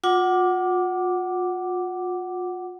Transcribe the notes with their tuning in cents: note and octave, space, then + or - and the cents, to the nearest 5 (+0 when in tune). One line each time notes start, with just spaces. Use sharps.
F4 +35 F#5 +10 D6 +0